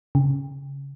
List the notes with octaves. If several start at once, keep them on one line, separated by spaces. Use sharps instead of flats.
C#3